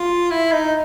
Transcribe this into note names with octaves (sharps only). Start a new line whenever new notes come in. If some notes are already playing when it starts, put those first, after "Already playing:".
Already playing: F4
E4
D#4